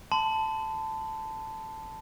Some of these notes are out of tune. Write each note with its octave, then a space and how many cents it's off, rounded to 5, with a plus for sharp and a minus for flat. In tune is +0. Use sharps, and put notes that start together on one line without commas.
A5 +0 C6 -40